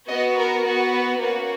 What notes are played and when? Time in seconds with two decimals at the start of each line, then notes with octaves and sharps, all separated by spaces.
0.08 B3 F#4 D#5
0.37 A#4
0.66 B3 F#4
0.93 B4
1.21 A#3 C#4 F#4 B4